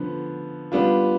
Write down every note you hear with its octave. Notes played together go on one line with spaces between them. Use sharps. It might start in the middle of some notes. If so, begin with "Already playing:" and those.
Already playing: D3 F3 B3
G3 B3 D4 F4